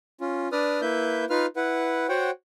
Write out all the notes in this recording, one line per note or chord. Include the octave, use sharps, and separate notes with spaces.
C#4 F4
D4 B4 D5 D#6 F6
A#3 E4 B4 E5 G6
D#4 F4 B4 F5 F6
E4 B4 F#5
F#4 C5 C#5 F#5 G5